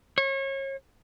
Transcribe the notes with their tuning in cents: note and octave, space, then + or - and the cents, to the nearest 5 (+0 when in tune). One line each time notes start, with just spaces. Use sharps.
C#5 -35